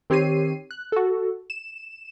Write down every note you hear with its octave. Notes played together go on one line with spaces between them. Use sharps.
D#3 C4 G4 C#5 C7 D#7
F#6
F#4 A4
E7